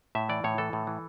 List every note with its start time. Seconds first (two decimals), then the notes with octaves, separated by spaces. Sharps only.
0.15 A2 E5
0.29 E3 D5
0.44 A2 C#5
0.58 E3 A4
0.73 A2
0.87 E3